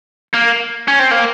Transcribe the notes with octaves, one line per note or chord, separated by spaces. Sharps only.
A#3
C#4
C4
A#3